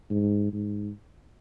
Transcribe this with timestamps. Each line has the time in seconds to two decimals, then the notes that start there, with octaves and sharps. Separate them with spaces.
0.10 G#2
0.52 G#2